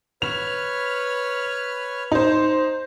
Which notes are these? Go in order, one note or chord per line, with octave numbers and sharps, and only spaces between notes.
B4 C#5 F6 F7
D#4 C5